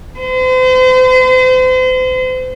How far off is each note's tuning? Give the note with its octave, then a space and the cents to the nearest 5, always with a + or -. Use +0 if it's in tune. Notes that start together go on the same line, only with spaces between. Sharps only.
C5 -40